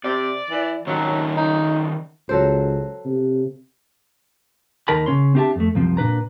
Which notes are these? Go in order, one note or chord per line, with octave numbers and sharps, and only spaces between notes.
C3 D5
E3
D#3 F#3 C4 C#4
D#4
C#2 F#3 A4 C5
C3
D#2 D#3 A#4 D#5 A5 B5
C#3 C#4 C#5 C6
C4 D4 G4 D#5 E5 A5
F2 A3
C2 F#2 F3 C4
A#2 D4 B4 A#5